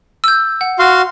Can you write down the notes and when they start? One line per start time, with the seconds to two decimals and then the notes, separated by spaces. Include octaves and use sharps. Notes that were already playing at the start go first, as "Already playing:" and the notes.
0.24 E6 G6
0.61 F#5
0.79 F#4 F5 C6